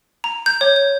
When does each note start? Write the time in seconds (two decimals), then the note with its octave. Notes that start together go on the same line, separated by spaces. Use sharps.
0.24 A#5
0.46 G6
0.61 C#5
0.76 G6